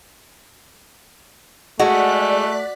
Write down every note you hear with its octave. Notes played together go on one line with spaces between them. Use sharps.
G#3 A3 F#4 D5 F#6 B6